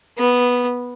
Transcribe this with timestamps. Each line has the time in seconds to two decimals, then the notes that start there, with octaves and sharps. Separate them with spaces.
0.17 B3